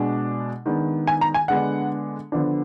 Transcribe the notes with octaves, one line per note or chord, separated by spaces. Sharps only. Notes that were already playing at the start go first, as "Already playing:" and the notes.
Already playing: B2 G#3 D4
D#3 G#3 B3 D4
G#5
A#5
G#5
D3 G#3 B3 D4 F#5
D3 F3 B3 D4